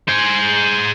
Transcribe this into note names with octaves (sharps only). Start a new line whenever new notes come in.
G#4 C5